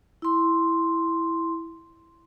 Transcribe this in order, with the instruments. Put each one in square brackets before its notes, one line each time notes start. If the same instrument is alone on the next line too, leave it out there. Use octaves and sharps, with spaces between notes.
[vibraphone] E4 C6